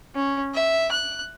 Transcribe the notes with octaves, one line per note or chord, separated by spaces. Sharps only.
C#4
E5
F#6